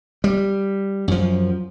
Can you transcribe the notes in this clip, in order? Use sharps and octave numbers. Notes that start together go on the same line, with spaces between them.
G3
F#2 F3